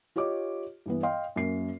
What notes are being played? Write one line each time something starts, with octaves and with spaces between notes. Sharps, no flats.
F4 G4 C#5 D#5 D6
G2 E3 B3
D#5 F5 G5 C6
F#2 A#3 C7